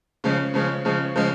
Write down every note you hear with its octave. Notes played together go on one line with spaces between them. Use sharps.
C#3 F3 G#3 C#4
C#3 F3 G#3 C#4
C#3 F3 G#3 C#4
C#3 F3 G#3 C#4